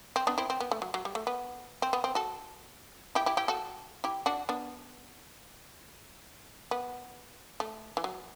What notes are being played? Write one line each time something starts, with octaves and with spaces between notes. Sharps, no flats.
C4
B3 D4
C4 E4
C4
B3
A3
F#3
F#3
G3
A3
B3
C4
B3
C4
F#4 A4
E4 G4
E4 G4
E4 G4
F#4 A4
E4 G4
D4 F#4
B3 D4
B3
A3
E3
F#3